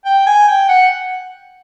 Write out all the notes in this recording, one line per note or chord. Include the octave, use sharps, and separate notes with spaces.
G5
G#5
G5
F#5